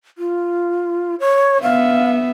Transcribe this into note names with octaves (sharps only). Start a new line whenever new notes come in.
F4
C#5
B3 E5 F5